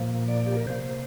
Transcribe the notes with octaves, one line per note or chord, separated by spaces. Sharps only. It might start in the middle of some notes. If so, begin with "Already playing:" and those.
Already playing: A#2 F3 A#3
D5
G4
A#4
C3 A#3 C5